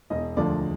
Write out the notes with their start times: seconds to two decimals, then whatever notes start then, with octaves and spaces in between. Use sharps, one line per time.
0.10 E1 D#5
0.37 D2 D3 F3 D5